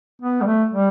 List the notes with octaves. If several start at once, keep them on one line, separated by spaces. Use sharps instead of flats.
B3
G3
A3
G3